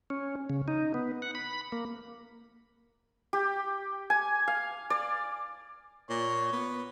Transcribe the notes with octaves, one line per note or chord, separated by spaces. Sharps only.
C#4
C#3
D#4
B3
F#5
B5
A#3
G4
G#5
F5
D5
A#2 C#5
B3